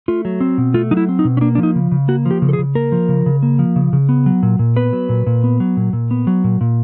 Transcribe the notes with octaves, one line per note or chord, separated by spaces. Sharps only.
A3 F4
F#3
C4
B2
A3 F4
F#3 D#4
E4
C4
D#4
B2
C#4
A#3 D4
D4
F3
D#4
C#3
C#3
A#3 F#4
F3
G4
C#3
A4
G#4
C#3
A#3 A#4
F3
C#3
C#3
A#3
F3
C#3
C#3
B3
F#3
A#2
A#2
B3 B4
F#3
A#2
A#2
B3
F#3
A#2
A#2
B3
F#3
A#2
A#2